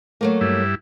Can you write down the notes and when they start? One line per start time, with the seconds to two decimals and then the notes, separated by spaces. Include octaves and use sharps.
0.21 F#3 A3 A#3
0.41 G2 E4